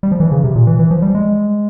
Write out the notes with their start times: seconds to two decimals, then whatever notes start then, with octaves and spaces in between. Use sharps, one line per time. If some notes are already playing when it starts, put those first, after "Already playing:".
0.03 G3
0.12 F3
0.20 E3
0.32 C#3
0.44 C3
0.55 A#2
0.67 E3
0.79 E3
0.91 F3
1.02 G3
1.15 G#3